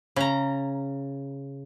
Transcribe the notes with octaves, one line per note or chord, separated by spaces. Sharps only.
C#3 A#5